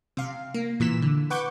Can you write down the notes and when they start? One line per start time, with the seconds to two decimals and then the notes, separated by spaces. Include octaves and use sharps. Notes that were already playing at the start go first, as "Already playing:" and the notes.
0.17 C3 F5
0.54 A#3
0.80 A#2 E3 B6 E7
1.02 D3
1.30 B4 F#5 C#6 D6 G6